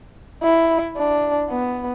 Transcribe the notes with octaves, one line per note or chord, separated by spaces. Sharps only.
E4
D4
B3